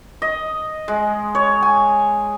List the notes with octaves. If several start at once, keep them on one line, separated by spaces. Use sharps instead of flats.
D#5
G#3
C#5
G#5